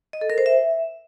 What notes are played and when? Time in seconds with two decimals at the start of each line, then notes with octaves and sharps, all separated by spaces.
0.13 D#5
0.21 A4
0.30 A#4
0.38 C5
0.46 E5